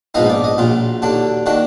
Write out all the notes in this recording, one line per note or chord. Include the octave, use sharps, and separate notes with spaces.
A#1 G#2 F3 B3 D#4 D#5
D5
D#5
A#1 A#2 F#3 F4
D#2 D3 F#3 D4
D#3 A#3 D4 F#4